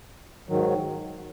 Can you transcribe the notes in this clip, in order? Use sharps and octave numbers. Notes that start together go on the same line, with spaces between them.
G#2 D#3 F#3